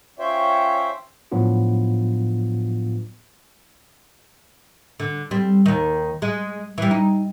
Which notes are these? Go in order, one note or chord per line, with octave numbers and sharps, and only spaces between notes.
C#4 F4 C5 C#5 E5 G5
A2 F3 F#3 B3 D4 F4
D3
G3 C4
D#2 D#3
G#3
E3 G3
D#4